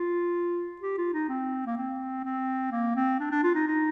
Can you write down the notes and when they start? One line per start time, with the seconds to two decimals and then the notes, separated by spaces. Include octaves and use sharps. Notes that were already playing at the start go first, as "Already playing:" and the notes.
Already playing: F4
0.81 G4
0.98 F4
1.13 D#4
1.29 C4
1.66 A#3
1.77 C4
2.24 C4
2.72 A#3
2.96 C4
3.20 D4
3.32 D4
3.43 F4
3.55 D#4
3.68 D#4